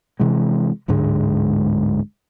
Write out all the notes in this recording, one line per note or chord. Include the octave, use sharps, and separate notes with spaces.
C3 E3 G#3
D1 G#2 D3 G#3